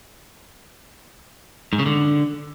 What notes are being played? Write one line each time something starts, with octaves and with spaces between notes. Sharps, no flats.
G#2
C#3
D3